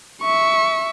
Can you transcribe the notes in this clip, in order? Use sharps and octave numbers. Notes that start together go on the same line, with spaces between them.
E5 C#6